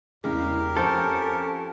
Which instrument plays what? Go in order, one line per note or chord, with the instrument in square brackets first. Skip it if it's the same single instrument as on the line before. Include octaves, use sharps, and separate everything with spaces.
[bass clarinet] E2 [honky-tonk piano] A2 C#3 G#3 [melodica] G4 A#4
[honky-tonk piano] F2 C5 G6 [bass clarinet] C#4 [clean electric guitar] A4